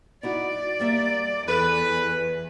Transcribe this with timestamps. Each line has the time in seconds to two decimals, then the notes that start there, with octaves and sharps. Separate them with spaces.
0.23 D#4 E4 F#4 D5
0.80 G3 A#3 E5
1.48 E2 A4 B4